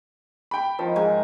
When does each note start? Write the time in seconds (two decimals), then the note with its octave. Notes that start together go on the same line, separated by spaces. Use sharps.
0.51 G5 B5
0.79 D#3 F3
0.96 G#2 G#5 A#5